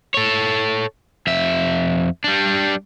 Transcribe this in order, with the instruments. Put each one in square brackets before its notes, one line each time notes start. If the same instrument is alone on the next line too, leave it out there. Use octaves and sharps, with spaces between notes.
[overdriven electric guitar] A4 C#5
F2 E5
G3 D4